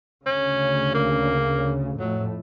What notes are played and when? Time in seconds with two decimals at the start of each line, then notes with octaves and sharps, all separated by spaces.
0.26 D2 C#3 C#4
0.94 A#3
2.00 F2 A2 F#3 A3